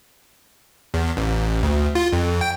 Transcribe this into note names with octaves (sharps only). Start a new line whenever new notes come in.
E2
A1
D2
F4
F2
G5